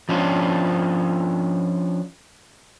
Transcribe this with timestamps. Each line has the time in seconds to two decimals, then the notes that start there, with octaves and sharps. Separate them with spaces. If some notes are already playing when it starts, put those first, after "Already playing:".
0.09 F3 C#4 D4 F4